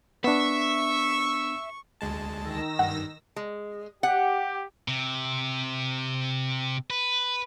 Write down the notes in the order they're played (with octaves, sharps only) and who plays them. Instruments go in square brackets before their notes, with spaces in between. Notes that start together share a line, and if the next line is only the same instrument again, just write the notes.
[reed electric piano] B3 D4 [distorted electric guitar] E5 [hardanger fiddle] C#6
[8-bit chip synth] D2 G#3 A5
[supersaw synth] D#3 E6 A#6
[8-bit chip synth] G2 [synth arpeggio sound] F#5
[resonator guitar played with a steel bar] G#3
[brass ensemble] G4 [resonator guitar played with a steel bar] F#5
[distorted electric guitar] C3
B4